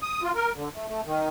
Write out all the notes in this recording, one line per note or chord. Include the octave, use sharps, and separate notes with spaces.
D#6
F4
A#4
D3
A3
A3
D#3